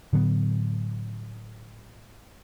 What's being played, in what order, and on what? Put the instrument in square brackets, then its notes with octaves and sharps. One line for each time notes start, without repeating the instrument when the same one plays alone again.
[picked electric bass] A2 D3 F#3 B3